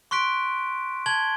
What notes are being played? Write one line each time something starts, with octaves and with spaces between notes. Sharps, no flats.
C6 C#6 F#6 B6 D7
A5 G#6 F#7 G7